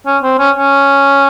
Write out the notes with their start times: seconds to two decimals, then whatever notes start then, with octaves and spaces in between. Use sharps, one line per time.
0.06 C#4
0.23 C4
0.39 C#4
0.56 C#4